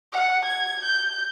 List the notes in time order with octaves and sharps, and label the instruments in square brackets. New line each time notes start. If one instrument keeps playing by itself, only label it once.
[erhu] F#5
G#6
G6